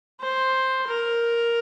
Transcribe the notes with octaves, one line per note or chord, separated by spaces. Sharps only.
C5
A#4